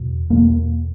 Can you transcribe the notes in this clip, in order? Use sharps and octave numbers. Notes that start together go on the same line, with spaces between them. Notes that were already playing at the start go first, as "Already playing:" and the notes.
Already playing: E2 B2
E2 B2 A#3